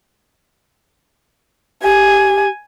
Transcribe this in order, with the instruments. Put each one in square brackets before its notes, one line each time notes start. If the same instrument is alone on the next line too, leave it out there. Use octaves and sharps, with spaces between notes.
[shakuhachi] G4 [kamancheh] G#5